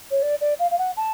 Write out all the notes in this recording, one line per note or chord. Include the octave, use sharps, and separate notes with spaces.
C#5
D5
D5
F5
F5
F#5
A5